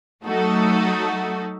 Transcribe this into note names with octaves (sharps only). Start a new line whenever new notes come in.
F#3 A3 D#4 F#4 A4